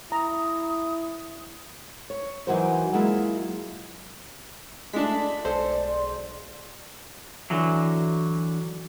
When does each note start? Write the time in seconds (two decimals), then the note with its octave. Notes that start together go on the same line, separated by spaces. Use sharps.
0.12 E4 A#5 D#6
2.10 C#5
2.47 E3 F#3 D#4 F#4 A#4 C5
2.93 F#3 G#3 A#3 E4 F4
4.93 G#3 A3 D4 A5 B6
5.20 D5
5.45 B1 G#3 A4 C5
7.50 D3 E3 F#3